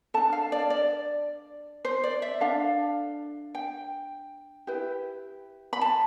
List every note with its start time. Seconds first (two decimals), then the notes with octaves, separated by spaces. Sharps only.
0.14 D4 A4 A5
0.33 F5
0.52 D5
0.70 D5
1.85 C5
2.04 D5
2.22 E5
2.41 D4 A4 F5
3.55 G5
4.67 E4 G4 B4
5.73 B5
5.81 A5